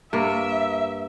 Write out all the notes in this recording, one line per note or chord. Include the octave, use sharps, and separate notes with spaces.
G2 A#3 E5